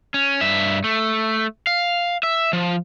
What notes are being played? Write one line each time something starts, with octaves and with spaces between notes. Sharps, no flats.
C#4
G2 E5
A3
F5
E5
F3